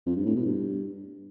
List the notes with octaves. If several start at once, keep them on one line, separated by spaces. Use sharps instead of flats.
F2
G2
A2
B2
G2